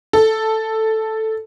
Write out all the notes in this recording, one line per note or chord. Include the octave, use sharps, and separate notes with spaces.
A4